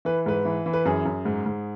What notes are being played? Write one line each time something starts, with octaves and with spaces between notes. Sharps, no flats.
E3 B4
G#2 B4
E3
E3
B4
F#2 G#4
F#2
G#2
G#2